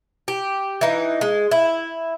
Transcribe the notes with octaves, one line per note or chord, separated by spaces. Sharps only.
G4
E3 D#4
G#3
E4